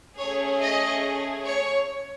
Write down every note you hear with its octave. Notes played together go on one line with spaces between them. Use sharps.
A3 C#4 G#4 C#5
D#5
C#5